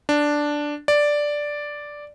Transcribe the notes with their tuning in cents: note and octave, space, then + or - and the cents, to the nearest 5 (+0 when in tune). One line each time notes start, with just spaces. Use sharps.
D4 +0
D5 +0